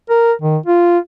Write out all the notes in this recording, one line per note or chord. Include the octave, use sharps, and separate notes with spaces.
A#4
D#3
F4